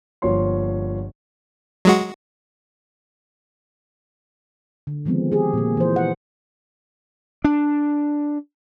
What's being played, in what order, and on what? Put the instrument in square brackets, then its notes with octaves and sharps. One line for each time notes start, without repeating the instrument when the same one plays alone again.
[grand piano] G1 F3 A#3 C#5 C6
[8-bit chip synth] F#3 G#3 F#4
[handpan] D3
D#3 F3 G#3 B3 C4
G4 G#4
A#2 A#3
E3 C5
F#5
[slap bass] D4